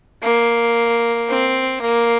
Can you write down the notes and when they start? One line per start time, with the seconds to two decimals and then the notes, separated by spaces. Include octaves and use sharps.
0.23 A#3
1.28 C4
1.81 A#3